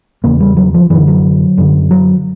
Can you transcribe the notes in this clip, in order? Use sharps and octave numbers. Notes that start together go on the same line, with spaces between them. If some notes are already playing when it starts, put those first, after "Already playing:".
E2 C#3 A#3
G3
F#3
F3
F#2 D3 E3
F#3
F#2 D3
F#3